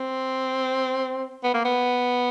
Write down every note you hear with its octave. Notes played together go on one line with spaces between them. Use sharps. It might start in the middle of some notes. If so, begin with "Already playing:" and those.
Already playing: C4
B3
A#3
B3